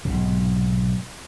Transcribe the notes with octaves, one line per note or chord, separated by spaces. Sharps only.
B1 G#2 C3